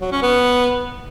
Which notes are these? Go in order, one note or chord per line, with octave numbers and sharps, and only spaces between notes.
F#3
C#4
B3